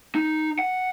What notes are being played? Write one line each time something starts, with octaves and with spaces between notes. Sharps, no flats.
D#4
F#5